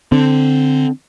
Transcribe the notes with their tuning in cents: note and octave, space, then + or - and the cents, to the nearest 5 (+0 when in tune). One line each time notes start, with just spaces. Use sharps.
D3 +0 C4 +0